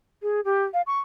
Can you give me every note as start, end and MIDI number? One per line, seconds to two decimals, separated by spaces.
0.22 0.41 68
0.45 0.64 67
0.74 0.82 77
0.87 1.00 85